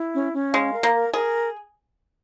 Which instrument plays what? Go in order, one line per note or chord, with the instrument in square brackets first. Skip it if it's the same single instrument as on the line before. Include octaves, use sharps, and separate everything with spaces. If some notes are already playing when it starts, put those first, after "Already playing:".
Already playing: [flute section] E4
C#4
C#4
[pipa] G#3 [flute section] F5
[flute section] A#4
[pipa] A#3
[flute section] A#4
[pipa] G#4 [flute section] A#4